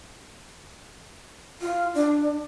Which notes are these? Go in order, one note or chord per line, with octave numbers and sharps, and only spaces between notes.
F4
D4